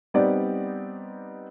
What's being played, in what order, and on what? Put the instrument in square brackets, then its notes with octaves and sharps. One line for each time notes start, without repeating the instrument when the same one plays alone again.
[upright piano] G3 B3 C4 D#4 G4 D5